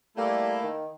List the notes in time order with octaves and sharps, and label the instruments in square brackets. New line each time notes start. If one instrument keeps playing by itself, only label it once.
[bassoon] G3 [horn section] A3 A#3 E4
[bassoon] D#3